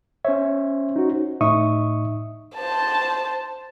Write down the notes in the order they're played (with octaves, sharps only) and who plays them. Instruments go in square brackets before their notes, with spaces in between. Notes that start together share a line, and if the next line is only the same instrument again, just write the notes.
[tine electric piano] C#4 C5 C#5 [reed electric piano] E5
[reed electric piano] D#4 F#4
A2 D#4 E5 C#6 D#6
[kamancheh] C5 A5